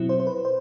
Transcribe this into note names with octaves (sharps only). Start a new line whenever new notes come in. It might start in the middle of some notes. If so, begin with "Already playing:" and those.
Already playing: B2 F#3 C4 E4
C5
C5
B4
C5